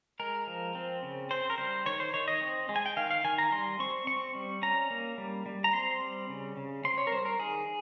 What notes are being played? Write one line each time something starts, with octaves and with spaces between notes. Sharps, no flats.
G#3 A#4
F3
C4
C#3
C4 C5
A#4
G3 C5
D#3 C#5
C5
D#3 C#5
D#5
C4
G#3
G#5
G5
D#3 F5
F5
D#3 G#5
A#5
G3 C6
C4 C#6
C4 C#6
G3
C#4 A#5
A#3
G3
G3
A#5
C4 C6
G3
C#3
C#3
C4 C6
C#5
A#4
G3 C5
A#4
D#3 G#4